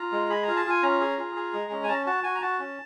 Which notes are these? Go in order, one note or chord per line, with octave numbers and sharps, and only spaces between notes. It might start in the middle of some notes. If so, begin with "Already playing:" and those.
Already playing: F4 A#5
G#3
G#4 B5
F4 A#5
A5
F4 G#5
C#4 A#5
G#4
F4
G#4
G#3
C#4
G#5
C#4 A5
F#4 A5
F#4 G#5
A#5
F#4 A5
C#4